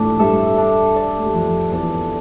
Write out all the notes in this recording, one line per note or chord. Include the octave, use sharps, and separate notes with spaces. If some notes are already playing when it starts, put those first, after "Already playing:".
Already playing: A2 F3 G3 A3 D4
G2 G3 A4 E5
D4
A4 D5
A3
G3
F2 F3 D4
E2 E3 A4 D5